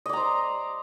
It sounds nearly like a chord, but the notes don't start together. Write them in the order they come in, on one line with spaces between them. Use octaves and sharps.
D#5 D5 A#5 C5